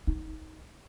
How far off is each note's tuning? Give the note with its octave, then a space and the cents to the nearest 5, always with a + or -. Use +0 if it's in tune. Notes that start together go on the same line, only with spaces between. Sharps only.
D#4 +15